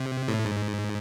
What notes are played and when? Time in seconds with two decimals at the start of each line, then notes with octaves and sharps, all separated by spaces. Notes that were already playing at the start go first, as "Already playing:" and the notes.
Already playing: C3
0.28 A2
0.46 G#2